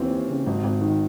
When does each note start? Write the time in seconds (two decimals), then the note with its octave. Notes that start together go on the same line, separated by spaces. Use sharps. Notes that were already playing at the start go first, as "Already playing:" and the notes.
Already playing: D#2 E3 C4
0.10 D#2
0.28 C#3
0.46 G#1
0.64 G#1
0.81 D#3